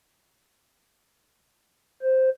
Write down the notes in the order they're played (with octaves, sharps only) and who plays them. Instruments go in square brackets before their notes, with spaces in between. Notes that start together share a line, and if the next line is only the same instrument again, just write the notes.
[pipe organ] C5